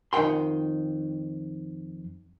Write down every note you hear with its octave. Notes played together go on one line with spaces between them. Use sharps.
F2 D#3 F#5 G5 C6